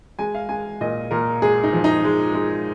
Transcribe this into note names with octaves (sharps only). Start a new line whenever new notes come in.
G#3 G#5
F5
G#3 G#5
A#2 D#5
A#2 A#4
G#3 G#4
D#4
F3
D#4
G#3
G#3